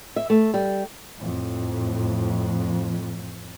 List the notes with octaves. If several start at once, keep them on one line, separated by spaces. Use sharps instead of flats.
E5
A3
G3
F2 A2